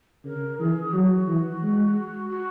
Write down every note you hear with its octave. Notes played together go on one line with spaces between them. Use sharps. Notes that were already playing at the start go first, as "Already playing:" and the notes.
C#3 A#4
E3 G#4
F#3 F#4
E3
G#3
F#4